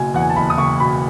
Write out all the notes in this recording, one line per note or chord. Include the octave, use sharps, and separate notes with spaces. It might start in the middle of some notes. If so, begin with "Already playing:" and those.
Already playing: F#1 B2 G#5
E2 F#5
G#5
A5
F#1 B5
D#6
F#1 C#6
B2 B5